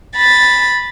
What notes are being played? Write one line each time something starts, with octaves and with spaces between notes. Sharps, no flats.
B5 A6